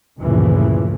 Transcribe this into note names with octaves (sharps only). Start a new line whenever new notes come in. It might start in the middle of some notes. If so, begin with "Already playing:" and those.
D2 G2 A#2 C#3 E3 F3